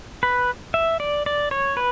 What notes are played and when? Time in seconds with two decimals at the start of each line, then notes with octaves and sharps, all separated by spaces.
0.23 B4
0.74 E5
1.00 D5
1.26 D5
1.51 C#5
1.77 B4